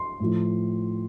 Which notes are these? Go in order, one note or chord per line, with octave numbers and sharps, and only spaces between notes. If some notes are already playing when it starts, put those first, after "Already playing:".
Already playing: C6
A2 F3